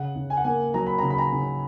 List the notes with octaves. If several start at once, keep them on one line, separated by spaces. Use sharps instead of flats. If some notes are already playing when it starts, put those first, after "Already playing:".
Already playing: C#3 F#5
C#3
G#5
F#5
A#3 G#5
F#3 A#5
B5
C#3 A#5
B5
A#5
C#3